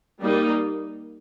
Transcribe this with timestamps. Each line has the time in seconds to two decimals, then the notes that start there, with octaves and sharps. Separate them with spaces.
0.21 G3 A#3 D#4